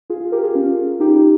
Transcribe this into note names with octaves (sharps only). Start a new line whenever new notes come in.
F4 G#4
F4 G#4
G4 A#4
F4 G#4
C#4 F4
D#4 G4
D#4 G4